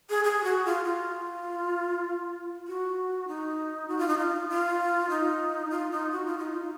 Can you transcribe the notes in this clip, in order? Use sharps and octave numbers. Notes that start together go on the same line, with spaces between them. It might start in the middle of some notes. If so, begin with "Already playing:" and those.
G#4
G#4
F#4
F4
F4
F#4
D#4
F#4
F4
D#4
F4
F4
D#4
F4
D#4
F#4
F4
D#4
F4